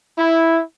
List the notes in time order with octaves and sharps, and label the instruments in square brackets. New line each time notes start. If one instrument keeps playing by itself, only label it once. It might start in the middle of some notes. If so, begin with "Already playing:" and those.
[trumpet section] E4